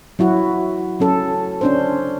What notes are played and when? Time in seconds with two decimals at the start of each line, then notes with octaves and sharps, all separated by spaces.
0.19 F#3 E4 F#4
1.00 F#3 C#4 A4
1.61 C#4 D4 C5